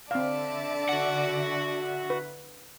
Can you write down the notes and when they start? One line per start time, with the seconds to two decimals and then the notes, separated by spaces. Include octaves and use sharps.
0.11 D3 C4 D5 E5 F5 A5
0.89 F#4 F#5
2.10 B4